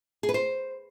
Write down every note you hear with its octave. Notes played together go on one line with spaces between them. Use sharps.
G#4
B4
C5